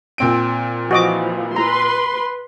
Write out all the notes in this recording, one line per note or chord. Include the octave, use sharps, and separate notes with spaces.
A#2 C4 D7
E3 F3 F#4 D#5 D6
B4 A#5 C6